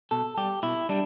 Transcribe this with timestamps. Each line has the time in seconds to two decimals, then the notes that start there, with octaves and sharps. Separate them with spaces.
0.11 B2 A4
0.37 G3 G4
0.63 B2 E4
0.89 G3 D4